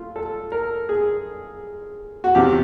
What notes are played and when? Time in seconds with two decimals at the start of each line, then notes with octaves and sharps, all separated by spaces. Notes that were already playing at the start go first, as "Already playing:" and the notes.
Already playing: A3 F4
0.16 A4
0.52 A#4
0.89 G#4
2.24 F#4
2.35 E2 C3 F3 G4